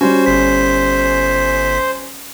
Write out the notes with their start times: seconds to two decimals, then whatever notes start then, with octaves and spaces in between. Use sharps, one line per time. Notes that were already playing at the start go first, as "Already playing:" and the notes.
0.01 G3 C#4 F#4 C5
0.26 G1 C5 B6